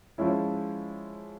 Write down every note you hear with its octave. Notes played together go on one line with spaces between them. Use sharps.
F3 G#3 C#4 E4